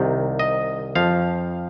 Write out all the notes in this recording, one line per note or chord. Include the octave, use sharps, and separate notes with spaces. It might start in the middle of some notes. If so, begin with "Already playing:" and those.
Already playing: C2 C3 D#3
D#5
F2 F3 F5